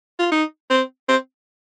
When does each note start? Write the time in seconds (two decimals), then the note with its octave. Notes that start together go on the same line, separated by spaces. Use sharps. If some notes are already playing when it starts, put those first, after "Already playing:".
0.19 F4
0.31 D#4
0.70 C4
1.09 C4